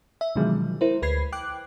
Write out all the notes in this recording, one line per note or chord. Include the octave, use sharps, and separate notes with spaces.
E5
B2 D3 D#3 F3 F#3 G#3
E4 A#4 C5
D2 B4 B5 G#6 C7
G5 D6 F#6